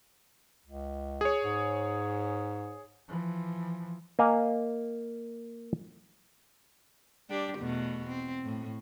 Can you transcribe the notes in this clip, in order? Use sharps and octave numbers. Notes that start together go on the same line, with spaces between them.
C#2
G#4 C#5
G#2
E3 F3
A#3 D#5 F5 G#5
G3 D4 G4
E2 B2 A3
C4
A2